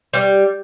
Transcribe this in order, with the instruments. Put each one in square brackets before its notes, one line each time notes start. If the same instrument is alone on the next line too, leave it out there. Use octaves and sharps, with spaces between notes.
[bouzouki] G3